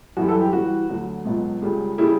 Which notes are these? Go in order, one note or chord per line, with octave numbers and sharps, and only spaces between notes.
F#2 E3 G3 F#4
A4
G4
G2 E3 G3 F#4
D2 D3 F#3
C#2 B2 F#3
C#2 C#3 G3
C#3 G3 E4